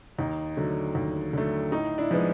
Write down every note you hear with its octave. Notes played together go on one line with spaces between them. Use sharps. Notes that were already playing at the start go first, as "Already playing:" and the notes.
D#2 D#4
D3 F#3 A3
D#2
D3 F#3 A3
A2 D#4
D4 E4
F3 G#3 B3